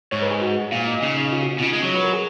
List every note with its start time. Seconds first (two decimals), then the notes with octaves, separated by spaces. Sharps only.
0.12 G#2 C#5
0.22 B4
0.31 G#4
0.41 F#4
0.72 A#2 F4
0.87 D#4
1.02 C#3 D#4
1.17 D#4
1.32 F4
1.42 F#4
1.53 D#4
1.58 B2
1.62 C#3 F4
1.73 G#3
1.82 F#3 C#5
1.95 B4
2.04 A#4
2.13 G#4